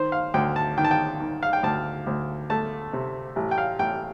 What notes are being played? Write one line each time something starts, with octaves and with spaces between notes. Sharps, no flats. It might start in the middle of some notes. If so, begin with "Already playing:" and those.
Already playing: D#3 C5
F5
D2 G5
A5
D#3 G5
A5
G5
D#3
F5
G5
D2 A5
D2
A3 A5
C3
A1
G5
F5
A1 G5